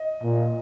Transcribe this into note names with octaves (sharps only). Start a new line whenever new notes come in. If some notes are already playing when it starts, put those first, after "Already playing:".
Already playing: D#5
A#2